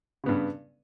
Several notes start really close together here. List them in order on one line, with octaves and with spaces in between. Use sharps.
C#3 B3 G2